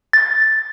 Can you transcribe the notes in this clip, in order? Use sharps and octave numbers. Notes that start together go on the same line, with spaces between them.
A6